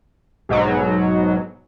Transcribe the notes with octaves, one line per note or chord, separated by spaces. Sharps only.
B1 G#2 B2 F#3